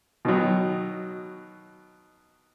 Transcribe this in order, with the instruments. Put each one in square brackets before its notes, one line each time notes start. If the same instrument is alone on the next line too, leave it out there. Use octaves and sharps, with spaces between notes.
[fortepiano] B2 D#3 F#3